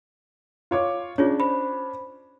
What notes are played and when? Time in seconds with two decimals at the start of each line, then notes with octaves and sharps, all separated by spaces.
0.71 F4 C#5 D6
1.18 C#4 D4 F4 G#4 C#5
1.40 C5 B5